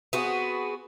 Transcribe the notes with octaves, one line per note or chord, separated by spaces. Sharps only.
B3 C4 F#4 G#4